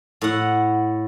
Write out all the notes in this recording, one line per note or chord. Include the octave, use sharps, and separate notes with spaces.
A2 F#5